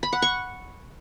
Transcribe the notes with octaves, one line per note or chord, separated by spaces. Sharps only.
B5
F#5
C#6